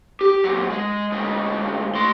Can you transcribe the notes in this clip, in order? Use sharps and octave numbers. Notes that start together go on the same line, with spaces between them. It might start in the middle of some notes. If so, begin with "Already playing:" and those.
G4
A#2 F#3
G#3
D2 G#3
A3 C6